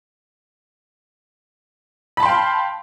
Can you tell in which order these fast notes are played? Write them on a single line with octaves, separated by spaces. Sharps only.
B5 A5 C6 G5 F5